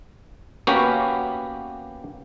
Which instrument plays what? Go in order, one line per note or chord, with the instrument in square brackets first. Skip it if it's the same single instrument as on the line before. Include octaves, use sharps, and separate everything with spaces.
[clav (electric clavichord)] A#3 B3 C#4 F#4 G4 B4